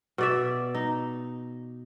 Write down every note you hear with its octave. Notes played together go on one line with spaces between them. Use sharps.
B2 D5 E5
D#4